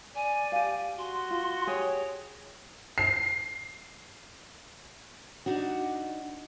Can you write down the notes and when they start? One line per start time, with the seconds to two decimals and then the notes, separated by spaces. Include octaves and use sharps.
0.15 D5 G#5
0.52 G4 F5
0.98 F#4 C6
1.31 F4
1.67 G4 G#4 C#5 G#5
2.98 C7
5.46 D4 D#4 F#4